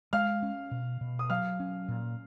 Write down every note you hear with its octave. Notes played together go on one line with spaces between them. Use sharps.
G#3 F5 F6
C#4
B2
B2
D#6
F#3 F5 F6
C#4
A#2